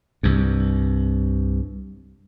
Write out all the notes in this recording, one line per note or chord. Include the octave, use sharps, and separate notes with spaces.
C2 G2